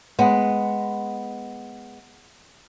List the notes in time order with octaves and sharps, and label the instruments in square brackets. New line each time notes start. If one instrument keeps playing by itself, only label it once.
[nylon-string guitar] G#3 B3